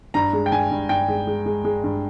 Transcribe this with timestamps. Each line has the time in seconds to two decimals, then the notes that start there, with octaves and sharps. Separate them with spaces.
0.14 G2 A#5
0.33 G#3
0.46 G5
0.52 G2 G#5
0.71 G2
0.89 G2 G5
1.08 G#3
1.27 G#3
1.46 G#3
1.64 G#3
1.84 G2